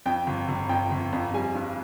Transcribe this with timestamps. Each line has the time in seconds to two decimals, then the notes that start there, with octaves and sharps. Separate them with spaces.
0.06 F2 G5
0.27 G1
0.48 G1
0.69 F2 G5
0.91 G1
1.13 F2
1.34 G3 G#5
1.55 G2